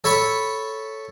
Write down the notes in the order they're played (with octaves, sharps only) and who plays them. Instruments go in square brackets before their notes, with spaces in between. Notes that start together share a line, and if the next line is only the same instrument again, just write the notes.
[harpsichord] A4 C#5 B5 C#6